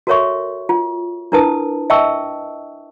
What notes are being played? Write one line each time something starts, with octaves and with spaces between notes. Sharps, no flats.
F#4 A4 A#4 C#5 E5 C#6
F4
D4 E4 A#4 B4 A5 D#6
D#5 E5 G5 A5 C#6 E6